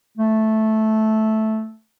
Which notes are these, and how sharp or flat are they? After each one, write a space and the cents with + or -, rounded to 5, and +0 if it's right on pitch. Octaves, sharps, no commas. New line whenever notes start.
A3 -10